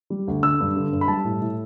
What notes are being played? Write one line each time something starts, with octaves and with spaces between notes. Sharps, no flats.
G3
D2
D3 E6
G2
D3
G2
B5
G3 A5
A2
A2